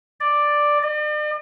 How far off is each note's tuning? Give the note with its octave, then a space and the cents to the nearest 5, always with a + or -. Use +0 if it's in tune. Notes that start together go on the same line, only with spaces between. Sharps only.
D5 +5
D5 +45